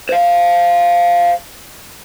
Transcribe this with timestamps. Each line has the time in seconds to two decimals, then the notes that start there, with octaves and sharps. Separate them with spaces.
0.09 C5 F5